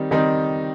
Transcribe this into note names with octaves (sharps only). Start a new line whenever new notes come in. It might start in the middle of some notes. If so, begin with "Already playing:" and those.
Already playing: D#3 G3 C4 D#4
D#3 G3 C4 D#4